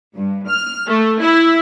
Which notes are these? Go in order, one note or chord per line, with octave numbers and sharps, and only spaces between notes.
G2
F6
A3
E4